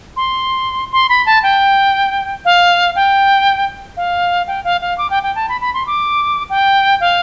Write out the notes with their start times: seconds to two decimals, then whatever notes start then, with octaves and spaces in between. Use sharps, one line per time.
0.16 C6
0.92 C6
1.09 B5
1.26 A5
1.43 G5
2.45 F5
2.96 G5
3.97 F5
4.48 G5
4.64 F5
4.81 F5
4.98 D6
5.10 G5
5.23 G5
5.35 A5
5.49 B5
5.61 B5
5.74 C6
5.87 D6
6.50 G5
7.01 F5